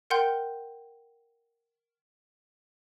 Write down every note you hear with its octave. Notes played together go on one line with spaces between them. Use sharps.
A#4 F#5 G5 C6 G6